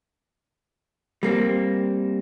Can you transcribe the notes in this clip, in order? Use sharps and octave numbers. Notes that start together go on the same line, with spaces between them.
G3 A#3 C4